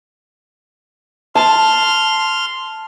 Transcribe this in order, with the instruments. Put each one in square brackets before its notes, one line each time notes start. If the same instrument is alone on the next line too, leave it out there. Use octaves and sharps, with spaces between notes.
[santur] A5 [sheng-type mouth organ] C6 F6